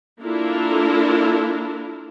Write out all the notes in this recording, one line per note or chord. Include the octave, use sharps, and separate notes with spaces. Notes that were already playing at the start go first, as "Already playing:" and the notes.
A#3 D4 E4 F4 A4 A#4